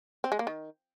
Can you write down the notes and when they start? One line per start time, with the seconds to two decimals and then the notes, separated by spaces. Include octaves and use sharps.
0.24 C4
0.32 G#3
0.39 A#3
0.47 D#3